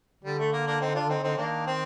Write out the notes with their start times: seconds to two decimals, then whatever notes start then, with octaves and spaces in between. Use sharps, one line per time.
0.23 D3 G3
0.39 A3
0.52 A#3
0.67 A#3 D4
0.81 C4 D#4
0.95 D4 F4
1.09 C4 D#4
1.23 C4 D#4
1.37 D#3 A#3 D4
1.66 C4